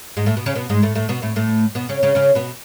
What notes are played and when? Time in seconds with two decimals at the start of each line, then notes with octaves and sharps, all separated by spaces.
0.17 G#2 G#3
0.26 A2 A3
0.37 B2 B3
0.46 C#3 C#4
0.55 B2 B3
0.69 G#2 G#3
0.82 A2 A3
0.95 A2 A3
1.09 B2 B3
1.22 A2 A3
1.36 A2 A3
1.75 B2 B3
1.89 C#3 C#4
2.03 C#3 C#4
2.15 C#3 C#4
2.35 B2 B3